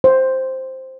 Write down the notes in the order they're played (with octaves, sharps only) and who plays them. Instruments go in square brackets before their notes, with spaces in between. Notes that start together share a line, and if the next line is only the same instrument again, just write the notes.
[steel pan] C5